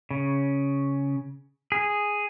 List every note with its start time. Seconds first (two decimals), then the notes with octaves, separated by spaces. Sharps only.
0.11 C#3
1.72 G#4